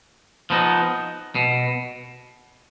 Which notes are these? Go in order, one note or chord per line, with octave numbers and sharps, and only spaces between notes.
F3 B3 D#4
B2